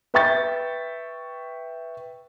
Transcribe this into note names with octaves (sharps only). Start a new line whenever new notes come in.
B4 E5 G5 C#6 G6 A6